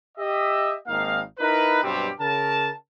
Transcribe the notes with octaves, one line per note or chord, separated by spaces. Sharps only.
G4 D#5 E5
G#1 A#3 D#4 F5
D#4 E4 A#4 B4
G2 B2 F#3 G3 C4 G4
C#3 A#4 A5